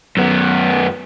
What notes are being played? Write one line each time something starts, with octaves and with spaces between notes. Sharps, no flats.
F#2 B3